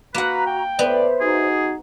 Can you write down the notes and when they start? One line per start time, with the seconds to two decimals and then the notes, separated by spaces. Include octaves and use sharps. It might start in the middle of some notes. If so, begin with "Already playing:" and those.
0.14 A#3 F#4 B4 F#5 A#5
0.47 G5
0.79 A2 B3 C5 D5 E5
1.21 D#4 F#4 G#4